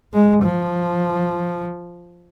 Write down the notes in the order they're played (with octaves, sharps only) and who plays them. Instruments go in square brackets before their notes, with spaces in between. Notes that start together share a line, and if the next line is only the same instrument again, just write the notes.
[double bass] G#3
F3